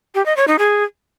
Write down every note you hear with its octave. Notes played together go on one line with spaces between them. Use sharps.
G4
D#5
C#5
D#4
G#4